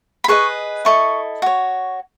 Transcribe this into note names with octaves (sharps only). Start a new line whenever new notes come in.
B5
G#4 B4 D#5 C#6
E4 A4 D#5 C#6
F#4 C#5